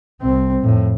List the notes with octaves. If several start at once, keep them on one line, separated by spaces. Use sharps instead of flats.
C2 C4
F2 A2